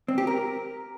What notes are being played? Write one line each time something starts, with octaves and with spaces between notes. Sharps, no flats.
C4
G4
A#4